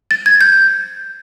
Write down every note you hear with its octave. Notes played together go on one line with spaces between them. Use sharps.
A6
G#6
G6